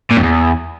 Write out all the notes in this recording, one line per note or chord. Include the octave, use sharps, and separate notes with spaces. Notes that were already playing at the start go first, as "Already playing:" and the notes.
A#2
F2
E2